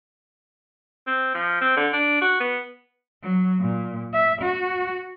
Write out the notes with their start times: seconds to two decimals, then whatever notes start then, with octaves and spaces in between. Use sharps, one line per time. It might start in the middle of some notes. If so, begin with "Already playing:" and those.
1.07 C4
1.34 F3
1.61 C4
1.76 D3
1.93 D4
2.22 F#4
2.40 B3
3.22 F#3
3.60 A#2
4.13 E5
4.42 F#4